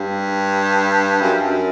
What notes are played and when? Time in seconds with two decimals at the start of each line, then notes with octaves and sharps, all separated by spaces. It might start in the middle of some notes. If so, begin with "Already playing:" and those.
Already playing: G2
1.21 F#2
1.42 F#2